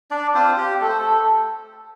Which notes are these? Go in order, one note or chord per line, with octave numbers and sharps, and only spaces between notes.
D4 D5
C4 F4 C5
G4
A3 A4
C5
A4